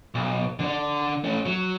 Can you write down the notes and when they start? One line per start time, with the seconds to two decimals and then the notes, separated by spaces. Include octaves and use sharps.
0.15 B1
0.59 D3 D4
1.24 A3 C#4
1.46 F#3